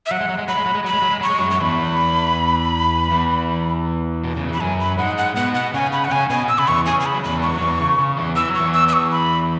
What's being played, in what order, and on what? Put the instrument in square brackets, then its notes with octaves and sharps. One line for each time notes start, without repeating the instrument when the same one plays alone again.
[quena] E5
[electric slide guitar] F#3 [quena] F#5
[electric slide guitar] G#3
F#3
G#3
[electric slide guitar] F#3 [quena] B5
[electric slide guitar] G#3
F#3
G#3
[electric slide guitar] F#3 [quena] B5
[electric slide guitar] G#3
F#3
G#3
[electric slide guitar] F#3 [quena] C#6
[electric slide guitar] G#3
F#2 F#3
[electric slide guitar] F#3 [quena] C#6
[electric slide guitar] E2 E3 [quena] B5
[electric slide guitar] E2 E3
B2
C#3
[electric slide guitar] E3 [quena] B5
[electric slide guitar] F#2 F#3 [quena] G#5
[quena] B5
[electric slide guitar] G#2 G#3 [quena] F#5
[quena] F#5
[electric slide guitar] B2 B3 [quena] F#5
[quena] F#5
[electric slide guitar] C#3 C#4 [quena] G#5
[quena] B5
F#5
[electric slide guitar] C#3 C#4 [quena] G#5
[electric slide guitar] B2 B3 [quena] G#5
[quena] E6
[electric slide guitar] C#3 [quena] B5
[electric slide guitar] E2 E3 [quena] C#6
[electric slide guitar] C#3 [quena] G#5
[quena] G#5
B5
[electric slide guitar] F#3
[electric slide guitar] E2 E3 [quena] B5
[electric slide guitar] B3
[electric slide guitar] G#3 [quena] C#6
[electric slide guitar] F#3
E2 E3
C#3
C#3
E2 E3
[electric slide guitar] E3 [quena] E6
[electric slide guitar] F#3
[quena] C#6
[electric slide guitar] E2 E3
[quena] E6
E6
C#6
B5